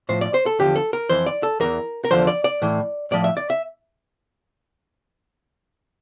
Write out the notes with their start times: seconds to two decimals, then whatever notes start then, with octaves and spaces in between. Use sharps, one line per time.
0.09 A2 F3 C5
0.21 D5
0.34 C5
0.46 A4
0.59 E2 D3 F3 G4
0.76 A4
0.93 A#4
1.10 F2 E3 C5
1.26 D5
1.43 A4
1.60 E2 E3 A#4
2.04 A#4
2.11 E2 D3 F3 C5
2.27 D5
2.44 D5
2.62 A2 E3
3.11 A2 F3 D5
3.24 E5
3.37 D5
3.50 E5